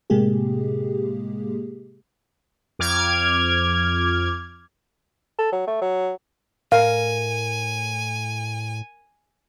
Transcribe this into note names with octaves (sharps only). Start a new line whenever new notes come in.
A2 C3 G#3 A#3 G4 G#4
F2 D6 F6 G#6
A4
F#3
A3
F#3
A2 A#4 F5 G#5